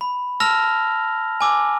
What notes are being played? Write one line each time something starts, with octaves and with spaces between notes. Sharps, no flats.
B5
A5 E6 F6 A#6 F7
G#5 D6 E6